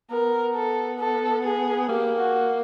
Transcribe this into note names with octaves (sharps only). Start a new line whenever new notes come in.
B3 A#4
A4
A4
G#4
A#3 G4
F#4